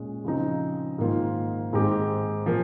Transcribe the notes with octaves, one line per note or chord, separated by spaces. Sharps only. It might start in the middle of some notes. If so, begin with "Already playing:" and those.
Already playing: A#2 G#3 C#4
C#3 F3 C4 D#4
G#2 D#3 A#3 F4
G#2 D#3 G#3 C4 G4
A#2 F3 A#3